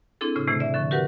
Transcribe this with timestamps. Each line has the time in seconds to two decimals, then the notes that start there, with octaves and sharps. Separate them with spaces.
0.21 C4 D4 E4 G#4 A4
0.36 A2 C#3 F6
0.47 A2 C3 D#3 E3 A3
0.60 D5 E5
0.74 D3 F3 C#6
0.91 F#4 G4 A#4 B4 F#5